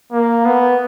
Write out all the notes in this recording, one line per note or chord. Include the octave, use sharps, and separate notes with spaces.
A#3
B3